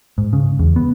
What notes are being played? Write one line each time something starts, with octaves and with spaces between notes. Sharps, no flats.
G#2
C#3
E2
B3